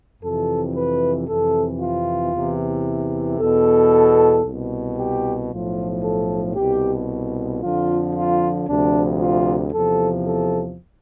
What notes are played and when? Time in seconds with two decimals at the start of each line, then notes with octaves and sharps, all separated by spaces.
0.23 F2 C3 E3 A4
0.76 B4
1.28 F2 C3 E3 A4
1.80 F4
2.34 E2 C3 E3
3.39 E2 B2 A4
4.45 C2 B2
4.98 G4
5.51 B1 A2 F3 F4
6.04 A4
6.56 C2 B2 G4
7.62 F2 D3 F3 F4
8.15 F4
8.67 D2 C3 F3 D4
9.21 F4
9.73 E2 C3 F3 A4
10.25 A4